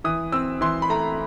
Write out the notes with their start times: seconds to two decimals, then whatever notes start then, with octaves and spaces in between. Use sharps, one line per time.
0.04 E3 D#6
0.32 C4 E6
0.61 E3 C6
0.82 B5
0.90 A3 A#5